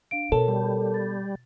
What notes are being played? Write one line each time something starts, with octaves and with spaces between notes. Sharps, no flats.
D4 F5 D7
B2 A4 A#4 C#5 A5
G3
A6